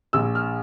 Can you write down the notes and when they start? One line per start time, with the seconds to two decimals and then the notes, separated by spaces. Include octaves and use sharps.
0.13 A#1 E6
0.35 F6